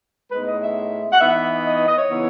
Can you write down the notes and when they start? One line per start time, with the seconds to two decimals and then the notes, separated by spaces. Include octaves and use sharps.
0.32 A2 G#3 B3 D#4 B4
0.47 D#5
0.61 E5
1.13 F#5
1.21 E3 B3 D#4 E5
1.65 D#5
1.76 D#5
1.88 D#5
1.99 C#5
2.10 C#3 E3 B3 D#4